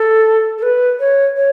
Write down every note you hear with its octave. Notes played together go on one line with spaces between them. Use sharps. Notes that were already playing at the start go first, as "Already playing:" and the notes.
Already playing: A4
A4
B4
C#5
C#5